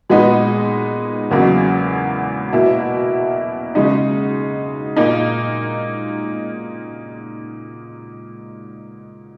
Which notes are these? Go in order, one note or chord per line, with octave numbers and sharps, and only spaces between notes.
A#2 G#3 B3 D#4
E2 C#3 F#3 A#3
B2 A#3 E4
C#3 G#3 D#4
A#2 A#3 D#4